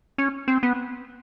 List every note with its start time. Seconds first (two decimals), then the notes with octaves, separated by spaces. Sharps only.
0.18 C#4
0.48 C4
0.63 B3